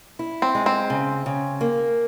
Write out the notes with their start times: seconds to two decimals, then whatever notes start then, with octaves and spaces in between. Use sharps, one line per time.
0.19 E4
0.42 C4
0.55 G#3
0.66 C4
0.90 C#3
1.26 C#3
1.61 A#3